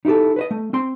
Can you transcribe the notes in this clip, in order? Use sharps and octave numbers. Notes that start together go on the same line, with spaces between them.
D#4 E4 F#4 G4 A4
B4 C5 D#5
A3
C4 C6